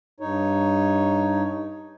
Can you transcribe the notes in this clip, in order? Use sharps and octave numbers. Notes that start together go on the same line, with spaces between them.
G2 D#4 C#5